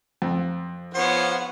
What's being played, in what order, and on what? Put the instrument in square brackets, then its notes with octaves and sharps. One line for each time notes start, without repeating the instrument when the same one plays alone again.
[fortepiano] F2
[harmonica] F3 C#5 [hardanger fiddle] B3 C5 [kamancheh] F#5